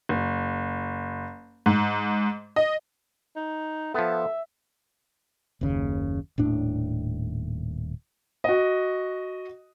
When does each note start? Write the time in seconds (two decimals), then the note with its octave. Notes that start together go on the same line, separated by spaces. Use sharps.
0.09 F#1
1.66 G#2
2.56 D#5
3.36 D#4
3.94 F3 B3 A4 E5
5.61 F#1 D#2 C#3
6.38 D#1 A2 D4
8.44 F#4 D#5